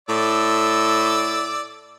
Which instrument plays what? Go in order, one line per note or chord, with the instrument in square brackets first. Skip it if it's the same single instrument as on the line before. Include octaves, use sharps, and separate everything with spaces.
[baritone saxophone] A2 [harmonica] D5 D6 E6